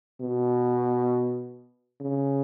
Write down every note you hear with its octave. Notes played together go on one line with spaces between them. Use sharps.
B2
C#3